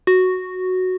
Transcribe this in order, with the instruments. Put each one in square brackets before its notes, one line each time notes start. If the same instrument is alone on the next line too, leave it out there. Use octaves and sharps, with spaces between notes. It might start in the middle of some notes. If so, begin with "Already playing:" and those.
[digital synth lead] F#4